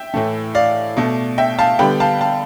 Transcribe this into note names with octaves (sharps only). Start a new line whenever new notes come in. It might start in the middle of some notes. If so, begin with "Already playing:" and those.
Already playing: E5 G5
A2 E3 A3
D5 F5
B2 A3
E5 G5
F5 A5
D3 G3 B3 G5 B5
F5 A5
F5 A5